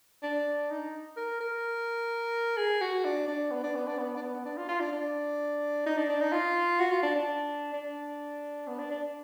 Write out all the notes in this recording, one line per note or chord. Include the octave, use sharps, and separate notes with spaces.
D4
D#4
A#4
A#4
G#4
F#4
D4
D4
B3
D4
B3
D4
B3
D4
B3
D4
F4
F4
D4
D4
D#4
D4
D4
D#4
F4
F#4
F4
D4
D4
D4
B3
D4
D4